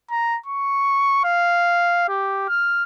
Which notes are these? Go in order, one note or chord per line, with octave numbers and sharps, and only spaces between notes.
A#5
C#6
F5
G4
F6